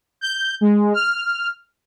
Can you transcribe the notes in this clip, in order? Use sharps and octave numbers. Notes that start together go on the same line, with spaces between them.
G6
G#3
F6